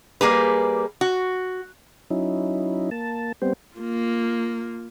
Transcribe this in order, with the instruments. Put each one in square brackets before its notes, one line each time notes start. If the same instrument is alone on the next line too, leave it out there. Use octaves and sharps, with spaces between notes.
[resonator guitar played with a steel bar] G3 A#3 G#4 B4
F#4
[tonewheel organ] F#3 C#4 D#4 E4
A#3 A5
G3 B3 C4 C5
[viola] A#3 F4